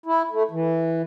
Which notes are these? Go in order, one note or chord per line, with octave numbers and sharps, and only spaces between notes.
E4
A3
E3